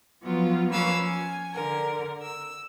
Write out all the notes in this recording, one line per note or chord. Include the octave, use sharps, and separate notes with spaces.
F3 F#3 B3 F4
F3 A#3 C#4 B4 F5 E6
G#5
D3 A#4
E6